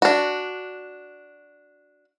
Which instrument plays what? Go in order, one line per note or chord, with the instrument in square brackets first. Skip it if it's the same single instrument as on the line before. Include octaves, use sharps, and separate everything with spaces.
[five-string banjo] D4 F#4